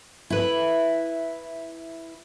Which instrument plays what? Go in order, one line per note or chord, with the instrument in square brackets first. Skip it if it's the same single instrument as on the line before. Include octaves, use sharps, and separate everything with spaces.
[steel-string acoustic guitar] E4 B4